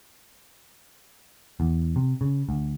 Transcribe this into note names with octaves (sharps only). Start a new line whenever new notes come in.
E2
C3
C#3
D2